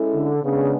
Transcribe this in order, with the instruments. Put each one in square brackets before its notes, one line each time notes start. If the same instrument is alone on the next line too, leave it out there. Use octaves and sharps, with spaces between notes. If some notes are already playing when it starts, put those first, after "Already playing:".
Already playing: [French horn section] G#3 C#4 E4 A4
[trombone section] D3
[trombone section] C#3 [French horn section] G#3 B3 D4